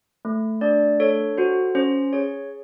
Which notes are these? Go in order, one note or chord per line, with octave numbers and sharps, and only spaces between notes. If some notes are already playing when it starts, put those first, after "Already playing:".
A3
D4 D5
A4 C#5
F#4 C5
C#4 C5
G#4 C#5